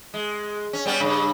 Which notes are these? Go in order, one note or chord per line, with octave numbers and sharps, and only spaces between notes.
G#3
C#4
G3 B3 C#4
G2 C#3